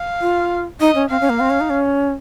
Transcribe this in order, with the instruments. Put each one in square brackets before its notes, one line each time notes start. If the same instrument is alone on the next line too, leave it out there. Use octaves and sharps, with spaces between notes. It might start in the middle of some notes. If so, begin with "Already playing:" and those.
Already playing: [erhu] F5
[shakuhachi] F4
[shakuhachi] D#4 [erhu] D#5
[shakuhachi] C#4
[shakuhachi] C4 [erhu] F5
[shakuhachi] C#4
A#3
C4
C#4
D#4
C#4